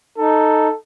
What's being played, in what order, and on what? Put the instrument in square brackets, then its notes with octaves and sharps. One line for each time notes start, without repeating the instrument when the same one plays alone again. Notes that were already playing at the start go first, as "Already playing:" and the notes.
[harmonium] D#4 [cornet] A4